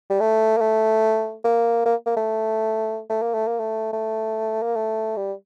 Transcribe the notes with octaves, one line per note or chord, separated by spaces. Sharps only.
G3
A3
A#3
A3
A#3
A#3
A#3
A3
A3
A#3
A3
A#3
A3
A3
A#3
A3
G3